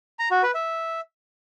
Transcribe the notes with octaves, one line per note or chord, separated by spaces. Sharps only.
A#5
F#4
B4
E5